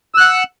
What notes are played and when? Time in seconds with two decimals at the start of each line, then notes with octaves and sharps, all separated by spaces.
0.15 E6
0.18 F#6
0.20 F#5